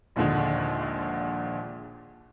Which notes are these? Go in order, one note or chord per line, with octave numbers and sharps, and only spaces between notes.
A#1 D#2 A#2 D3 G#3